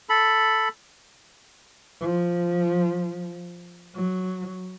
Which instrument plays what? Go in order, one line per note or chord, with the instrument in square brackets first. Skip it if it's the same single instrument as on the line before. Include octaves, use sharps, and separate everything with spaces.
[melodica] A4 B5
[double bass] F3
F#3